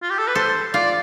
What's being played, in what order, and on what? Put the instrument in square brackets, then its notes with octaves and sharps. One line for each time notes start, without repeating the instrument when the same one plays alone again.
[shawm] F4
G4
A4
B4
[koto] A4 [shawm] C5
[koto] F4 [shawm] D5